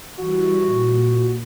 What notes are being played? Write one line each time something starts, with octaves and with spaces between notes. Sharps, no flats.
E3 G3 E4 F#4
A#2